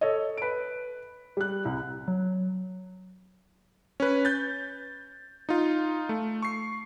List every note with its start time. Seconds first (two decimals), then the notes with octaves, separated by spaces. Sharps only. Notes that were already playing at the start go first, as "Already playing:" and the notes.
0.01 A4 C#5 D#5
0.37 B4 D7
1.37 G3 F#6
1.65 C2
2.08 F#3
4.00 C#4 B4
4.25 G6 A6
5.49 D#4 F4
6.09 A3
6.43 C#6 C7